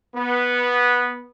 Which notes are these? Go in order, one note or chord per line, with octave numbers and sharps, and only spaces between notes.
B3